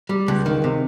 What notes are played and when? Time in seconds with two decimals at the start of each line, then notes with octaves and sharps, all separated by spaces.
0.09 G3
0.28 C#2
0.46 D#3
0.64 C3